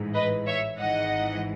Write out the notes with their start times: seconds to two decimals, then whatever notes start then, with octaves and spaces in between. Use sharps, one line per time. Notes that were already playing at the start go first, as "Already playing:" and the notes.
Already playing: A1 G#2 E3
0.14 B4 D#5
0.46 C#5 E5
0.78 G#1 G#2 E3 D#5 F#5